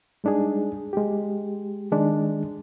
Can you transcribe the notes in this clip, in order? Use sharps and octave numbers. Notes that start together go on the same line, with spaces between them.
G3 G#3 D4 D#4 G#4
G#3 G4
D#3 G#3 D4